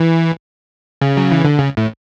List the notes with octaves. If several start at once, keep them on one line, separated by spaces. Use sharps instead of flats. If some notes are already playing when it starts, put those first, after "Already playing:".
Already playing: E3
C#3
F#3
E3
D3
C#3
A2